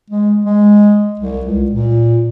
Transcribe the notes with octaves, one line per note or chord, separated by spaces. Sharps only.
G#3
G#3
C2
C#2
A#2